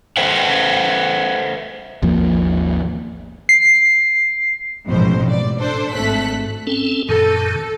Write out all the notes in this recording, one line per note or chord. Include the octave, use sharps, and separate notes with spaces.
A4 B4 C5 E5 F#5
G#1 D#2 F3 A#3
C7
A1 F2 G#2 B2 C5
D5
D4 A4 C5
G#1 A3 A4 F#6 B6
C4 C#4 A4
F#2 A#2 D#3 A4